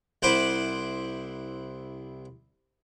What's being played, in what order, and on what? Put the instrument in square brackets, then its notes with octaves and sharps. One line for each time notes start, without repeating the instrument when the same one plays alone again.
[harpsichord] C2 E4 C5 F#5 B5 D6